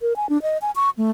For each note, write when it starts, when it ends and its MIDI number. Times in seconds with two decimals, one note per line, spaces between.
0.01 0.16 70
0.16 0.29 80
0.29 0.41 62
0.42 0.58 75
0.62 0.71 80
0.76 0.90 85
0.97 1.11 57